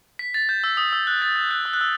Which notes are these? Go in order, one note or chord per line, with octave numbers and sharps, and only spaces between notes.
B6
A6
G6
E6
D#6
E6
F#6
A6
G6
F#6
E6
F#6
E6